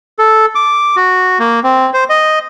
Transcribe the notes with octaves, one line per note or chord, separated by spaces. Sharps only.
A4
D6
F#4
A#3
C4
C5
D#5